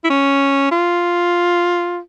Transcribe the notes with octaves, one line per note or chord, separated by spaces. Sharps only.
E4
C#4
F4